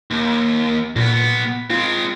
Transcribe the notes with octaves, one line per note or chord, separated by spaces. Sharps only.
D#2
B1 A#2 B3
G#3 C4 F4